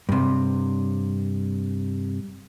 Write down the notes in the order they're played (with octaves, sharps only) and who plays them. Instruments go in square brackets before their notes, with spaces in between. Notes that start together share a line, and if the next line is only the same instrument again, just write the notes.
[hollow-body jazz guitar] G2 C3